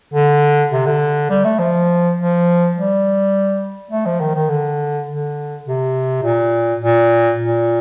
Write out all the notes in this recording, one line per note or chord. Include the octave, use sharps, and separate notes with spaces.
D3
C3
D3
G3
A3
F3
F3
G3
A3
F3
D#3
D#3
D3
D3
C3
A#2
A#2
A#2